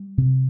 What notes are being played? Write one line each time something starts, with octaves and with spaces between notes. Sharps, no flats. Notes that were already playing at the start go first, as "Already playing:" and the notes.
Already playing: G3
C3